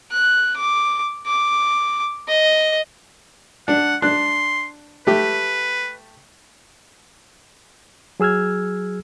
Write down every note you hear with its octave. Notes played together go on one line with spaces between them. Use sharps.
F#6
D6
D6
D#5
D4 F#5
D4 C6 F#6
A3 G4 B4
F#3 G#4 E6 F6 G#6